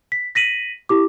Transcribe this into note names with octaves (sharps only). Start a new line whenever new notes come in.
B6
A#6 B6 D#7 F#7
E4 G4 D6